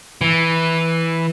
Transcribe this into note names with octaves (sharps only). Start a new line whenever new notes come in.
E3